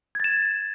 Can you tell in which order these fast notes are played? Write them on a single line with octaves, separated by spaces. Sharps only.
G#6 A6 E7